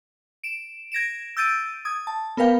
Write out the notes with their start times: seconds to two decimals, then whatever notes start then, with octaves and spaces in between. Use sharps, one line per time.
0.44 D7 E7
0.92 G#6 A#6 D7 E7
1.37 E6 G6 A6 D7 D#7
1.85 D#6 G#6
2.07 A5
2.37 B3 A#4 B4 F5 G5